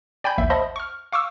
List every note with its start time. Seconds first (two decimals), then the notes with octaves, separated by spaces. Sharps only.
0.24 D5 G5 G#5 B5 G6
0.38 A1 D#2 E5
0.50 C5 D#5 E5 F#5 A5 B5
0.76 C#6 F6
1.12 F5 C#6 D6 E6